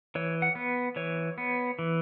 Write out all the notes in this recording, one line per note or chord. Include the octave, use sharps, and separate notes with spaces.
E3 C#5
F#5
B3
E3 C#5
B3
E3